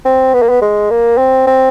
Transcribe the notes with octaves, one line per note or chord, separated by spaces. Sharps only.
C4
B3
A#3
B3
G#3
A#3
C4
C4